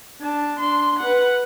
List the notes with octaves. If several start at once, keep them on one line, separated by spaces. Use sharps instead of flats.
D4 A5
D4 C6
B4 F#5